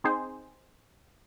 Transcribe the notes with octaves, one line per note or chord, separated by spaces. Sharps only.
C4 D#4 G#4 C5